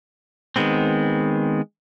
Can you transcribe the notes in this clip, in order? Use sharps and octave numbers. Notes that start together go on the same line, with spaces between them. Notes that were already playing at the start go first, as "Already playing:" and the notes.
D#3 G#3 B3 C4